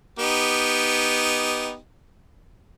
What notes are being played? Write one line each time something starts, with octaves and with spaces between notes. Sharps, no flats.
B3 D#4 G4